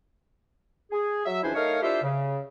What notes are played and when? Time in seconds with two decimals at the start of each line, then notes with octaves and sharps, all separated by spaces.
0.92 G#4
1.26 F#3 E5
1.43 C#2 E3 D4 E4 C5 G#5
1.55 A3 D#4 A#4 C#5 F5
1.83 D4 E4 F4 G4 C5 E5
2.03 C#3